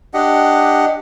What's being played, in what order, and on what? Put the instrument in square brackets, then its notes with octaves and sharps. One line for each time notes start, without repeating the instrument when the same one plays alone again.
[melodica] D4 G4 D#5 F#5